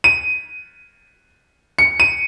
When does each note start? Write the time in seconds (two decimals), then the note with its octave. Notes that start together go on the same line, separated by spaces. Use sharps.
0.04 D#7
1.79 C#7
2.00 D#7